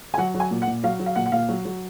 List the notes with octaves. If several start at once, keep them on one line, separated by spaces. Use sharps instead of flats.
G#5
F#3 F#5
F#3
G#5
A#2
F#5
A#2
F#3 F5
F#3
F5
A#2 F#5
F#5
A#2 F5
F#3
F#3